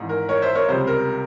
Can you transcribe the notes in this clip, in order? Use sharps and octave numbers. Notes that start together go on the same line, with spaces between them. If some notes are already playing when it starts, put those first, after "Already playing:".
Already playing: G#1 G#2 E3
A#4
A#4 C#5
C5 E5
A#4 C#5
C#2 C3 G3 C5
A#4